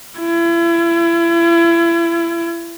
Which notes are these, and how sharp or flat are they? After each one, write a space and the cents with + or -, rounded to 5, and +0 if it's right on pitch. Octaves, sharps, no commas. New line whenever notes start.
E4 +35